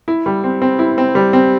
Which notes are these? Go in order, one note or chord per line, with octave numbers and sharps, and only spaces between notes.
E4
G3
C4
C4
E4
C4
G3
C4